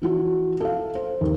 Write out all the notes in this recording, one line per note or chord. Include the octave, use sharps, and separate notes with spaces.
E3 E4 F#4
A4 F5
C5
D#2